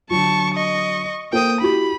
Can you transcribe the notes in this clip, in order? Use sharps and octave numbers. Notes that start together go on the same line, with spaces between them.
D3 F#3 A5 C#6
D#5 C#6
A#3 A4 C5 G5 D#6
E4 F#4 G4 B5